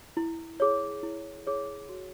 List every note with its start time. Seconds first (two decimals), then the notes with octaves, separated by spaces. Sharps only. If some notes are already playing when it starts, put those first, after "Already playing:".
0.17 E4
0.60 G#4 C#5
1.03 E4
1.47 G#4 C#5
1.89 F#4